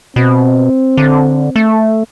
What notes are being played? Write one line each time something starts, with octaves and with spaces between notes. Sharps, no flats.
B2 C4
D3
A3